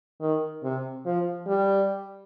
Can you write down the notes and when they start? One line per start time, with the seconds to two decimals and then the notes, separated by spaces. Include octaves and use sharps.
0.21 D#3
0.63 C3
1.06 F3
1.47 G3